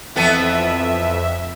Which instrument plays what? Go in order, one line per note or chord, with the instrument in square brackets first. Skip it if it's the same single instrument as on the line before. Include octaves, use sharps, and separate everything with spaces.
[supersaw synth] F2 E5 [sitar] E3 B3 A4